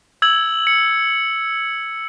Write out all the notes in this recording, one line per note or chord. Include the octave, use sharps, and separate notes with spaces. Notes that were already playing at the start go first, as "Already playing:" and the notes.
E6 G#6 F#7
C#7